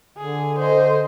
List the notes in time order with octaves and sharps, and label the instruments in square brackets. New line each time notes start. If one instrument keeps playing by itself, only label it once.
[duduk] D3 [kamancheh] G#4
[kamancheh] C5 D#5